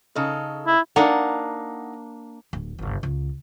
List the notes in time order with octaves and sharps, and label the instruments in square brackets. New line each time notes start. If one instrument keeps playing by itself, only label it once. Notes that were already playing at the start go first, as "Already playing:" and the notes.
[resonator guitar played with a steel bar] C#3 D#4 A4
[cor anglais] E4
[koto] A#3 D4 [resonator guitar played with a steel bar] D#4 F#5
[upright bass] D1
G1 C#2
C#2